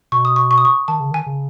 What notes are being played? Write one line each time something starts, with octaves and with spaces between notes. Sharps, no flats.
B2 C#6
D#6
C#6
C#6
D#6
C#6
D#3 A5
C#3
D#3 G#5
C#3